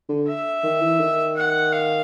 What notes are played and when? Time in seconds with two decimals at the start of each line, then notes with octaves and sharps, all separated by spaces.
0.09 D3
0.28 E5
0.63 D#3
0.82 E3
1.00 D#3
1.37 F#5
1.73 F5